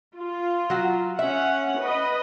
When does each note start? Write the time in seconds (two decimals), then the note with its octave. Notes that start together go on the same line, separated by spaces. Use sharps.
0.16 F4
0.70 F#3 F#4
1.19 C#4 E5 F#5
1.81 B4 D#5